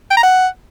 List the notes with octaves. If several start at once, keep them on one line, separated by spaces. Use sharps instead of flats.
G5
A#5
F#5